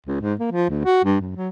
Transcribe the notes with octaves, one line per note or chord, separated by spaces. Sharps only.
C#2
G#2
A#3
F3
D2
F#4
G2
F#2
F#3